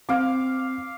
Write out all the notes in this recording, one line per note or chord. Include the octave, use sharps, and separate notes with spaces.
C4 F5 D6